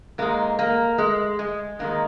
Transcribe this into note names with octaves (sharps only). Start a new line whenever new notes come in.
G#2 G#3 A#3
A#3
G#3
G#3
G#2 D#3 G#3 A#3